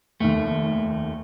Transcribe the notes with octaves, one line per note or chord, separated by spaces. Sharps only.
F1 D#2 A3